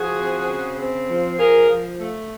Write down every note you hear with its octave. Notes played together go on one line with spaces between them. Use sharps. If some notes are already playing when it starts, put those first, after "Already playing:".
Already playing: F3 F#4 G#4
C4
C#3
C4
F3
F3 G#4 A#4
F3
A3